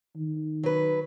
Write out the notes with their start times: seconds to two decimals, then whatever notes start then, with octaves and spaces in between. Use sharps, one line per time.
0.16 D#3
0.63 F#3 B4